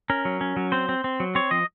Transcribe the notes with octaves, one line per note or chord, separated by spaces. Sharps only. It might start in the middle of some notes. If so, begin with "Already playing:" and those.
C#4 A#4
F#3
C#4
F#3
C4 C5
C4
C4
F#3
C4 C#5
F3 D#5